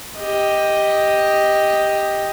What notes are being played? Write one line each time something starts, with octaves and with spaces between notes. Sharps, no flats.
G4 D#5